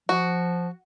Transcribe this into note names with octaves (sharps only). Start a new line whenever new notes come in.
F3 F#4